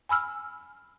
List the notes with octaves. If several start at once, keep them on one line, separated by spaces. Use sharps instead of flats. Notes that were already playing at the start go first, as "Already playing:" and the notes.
G#5 B5 E6 F6